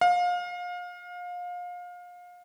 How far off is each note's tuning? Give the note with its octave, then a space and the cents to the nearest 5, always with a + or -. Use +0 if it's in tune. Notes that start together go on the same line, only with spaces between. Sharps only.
F5 +30